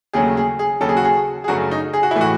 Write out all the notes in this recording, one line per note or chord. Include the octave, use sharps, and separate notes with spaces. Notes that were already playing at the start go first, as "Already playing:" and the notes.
D#2 C#3 F#3 A3 G#4
G#4
G#4
D#2 C#3 F#3 A4
G#4
F#4
G#4
G#4
F#2 C#3 F#3 A3 F#4
D#4
G#4
F#4
E4
A2 E3 A3
F#4